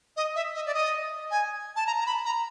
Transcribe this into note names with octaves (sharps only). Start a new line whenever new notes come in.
D#5
E5
D#5
D5
D#5
G#5
A5
A#5
A#5
B5
A#5